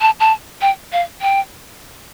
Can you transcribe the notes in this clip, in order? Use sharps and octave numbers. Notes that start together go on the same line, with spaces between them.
A5
A5
G5
F5
G5